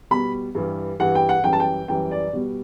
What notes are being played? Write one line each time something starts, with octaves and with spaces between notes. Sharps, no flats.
B2 G3 B5
G2 E3 G3
G2 E3 G3 F#5
G5
F#5
F#2 E3 G3 G5
A5
G5
F#2 E3 G3 G5
D5
B2 G3